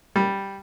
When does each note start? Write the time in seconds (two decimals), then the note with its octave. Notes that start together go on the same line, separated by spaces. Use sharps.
0.16 G3